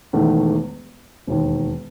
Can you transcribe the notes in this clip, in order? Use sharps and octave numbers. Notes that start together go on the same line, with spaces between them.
E1 E2 D#3 A3
E1 D#2 D#3